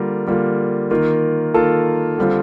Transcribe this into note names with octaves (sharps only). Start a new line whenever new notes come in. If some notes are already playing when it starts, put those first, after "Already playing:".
Already playing: D3 G3 A#3 F4 A#4
D3 G3 A#3 F4
D#3 A#3 F4
D#3 A#3 F4 A4
D3 G3 C4 F4